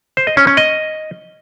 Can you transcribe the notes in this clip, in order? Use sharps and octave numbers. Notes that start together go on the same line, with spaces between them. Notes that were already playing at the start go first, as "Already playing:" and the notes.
C5
D#5
C#4
C#4
D#5